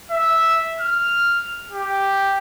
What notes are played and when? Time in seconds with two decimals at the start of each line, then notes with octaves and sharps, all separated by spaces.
0.11 E5
0.80 F6
1.72 G4